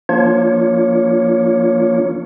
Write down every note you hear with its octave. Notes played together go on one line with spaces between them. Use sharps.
F3 A#3 D4 F4 C#5